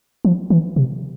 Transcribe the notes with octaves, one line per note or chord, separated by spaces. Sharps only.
F3
E3
C3